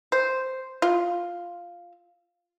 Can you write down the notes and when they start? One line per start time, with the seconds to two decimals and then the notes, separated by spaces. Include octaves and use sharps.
0.12 C5
0.82 F4